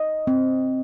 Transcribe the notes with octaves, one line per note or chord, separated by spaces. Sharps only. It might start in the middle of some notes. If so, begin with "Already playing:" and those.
Already playing: D#5
C4